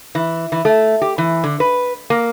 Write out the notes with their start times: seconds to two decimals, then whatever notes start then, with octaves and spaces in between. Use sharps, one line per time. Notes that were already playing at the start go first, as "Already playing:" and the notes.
0.15 E3
0.52 E3
0.65 A3
1.02 G4
1.18 E3
1.44 D3
1.60 B4
2.10 A#3